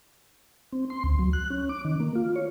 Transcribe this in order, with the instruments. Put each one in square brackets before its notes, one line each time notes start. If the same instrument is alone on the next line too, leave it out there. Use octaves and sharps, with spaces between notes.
[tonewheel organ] C4
C6
D2
F#3
F#6
C#4
D6
D#3
A#3
F4
C#5